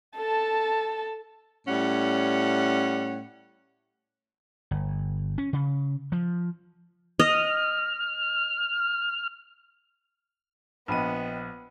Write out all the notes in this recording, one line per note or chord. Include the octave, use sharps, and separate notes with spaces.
A4 A5
A2 G3 C#4 F#5
G1
C#4
C#3
F3
D#5 F6
A#1 B3 D#5 G5 B5 D#7